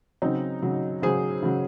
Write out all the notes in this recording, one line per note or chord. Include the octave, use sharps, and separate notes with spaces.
C#3 F#3 C4 D#4
C#3 F#3
C#3 F#3 G#4 C5
C#3 F#3